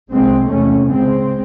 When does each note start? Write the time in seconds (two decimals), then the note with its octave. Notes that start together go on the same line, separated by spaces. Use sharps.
0.10 C2 C3 G#3 C4
0.48 E2 C3 A3 C#4
0.87 C#2 C#3 G#3 C4